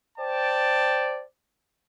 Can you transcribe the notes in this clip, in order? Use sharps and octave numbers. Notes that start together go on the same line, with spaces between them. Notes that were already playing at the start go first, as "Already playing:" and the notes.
C5 D5 G5 A5